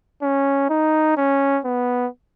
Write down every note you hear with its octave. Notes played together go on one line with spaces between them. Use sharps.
C#4
D#4
C#4
B3